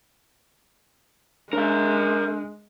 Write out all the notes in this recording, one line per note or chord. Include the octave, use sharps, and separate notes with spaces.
G#3 D4 A#4 E5